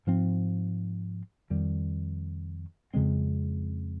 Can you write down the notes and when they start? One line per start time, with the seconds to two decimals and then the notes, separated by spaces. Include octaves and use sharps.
0.07 G#2 F3 C4
1.50 F2 D#3 G3
2.94 F2 C#3 G#3 C4